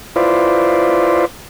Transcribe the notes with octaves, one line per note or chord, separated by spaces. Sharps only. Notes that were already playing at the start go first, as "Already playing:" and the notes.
E4 F4 B4 C5 D5